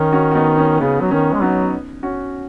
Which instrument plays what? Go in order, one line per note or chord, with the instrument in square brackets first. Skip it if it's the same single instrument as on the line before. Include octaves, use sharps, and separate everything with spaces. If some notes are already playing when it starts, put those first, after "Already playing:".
Already playing: [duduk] D#3 [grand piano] C#4
[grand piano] C#4 F#4
F#4
B3 D#4
C#4
[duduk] C#3 [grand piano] B3
[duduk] F#3
[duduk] D#3 [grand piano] C#4
[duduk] G#3
[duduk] F#3 [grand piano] B3 D#4
[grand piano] C#4 F#4